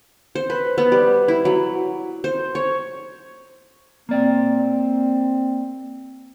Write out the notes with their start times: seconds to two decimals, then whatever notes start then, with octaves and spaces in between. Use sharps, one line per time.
0.35 C5
0.50 B4
0.78 B3
0.92 G3
1.28 E4
1.45 F#3
2.24 C5
2.55 C#5
4.09 A#3 C4 D5